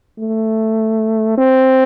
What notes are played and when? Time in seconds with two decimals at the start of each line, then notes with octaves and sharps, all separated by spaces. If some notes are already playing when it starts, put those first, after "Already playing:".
0.19 A3
1.38 C4